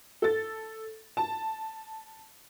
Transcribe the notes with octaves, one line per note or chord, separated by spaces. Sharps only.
A4 A6
A5